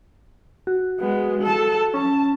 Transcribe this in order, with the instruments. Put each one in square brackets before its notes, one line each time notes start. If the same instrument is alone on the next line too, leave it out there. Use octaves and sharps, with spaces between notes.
[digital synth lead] F#4
[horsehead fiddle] G#3 B3
A4 A5
[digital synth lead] C#4 [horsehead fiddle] A5